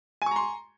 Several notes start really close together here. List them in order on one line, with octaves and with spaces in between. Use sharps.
G#5 C#6 A#5 C6